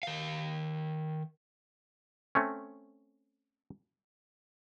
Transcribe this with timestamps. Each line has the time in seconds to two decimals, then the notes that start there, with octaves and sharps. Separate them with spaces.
0.03 D#3 F5
2.35 A3 C4 C#4